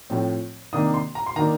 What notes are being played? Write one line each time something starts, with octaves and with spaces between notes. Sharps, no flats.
A2 F3 C4
C3 D#3 A#3 D4 D#6
C6
A#5
C6
D#3 A#3 D4 A#5